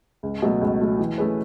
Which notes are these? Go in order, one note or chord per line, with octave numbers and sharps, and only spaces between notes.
C#2
B2 F#3 A3
C#2
B2 F#3 A3
E3
A3 C#4 G#4 B4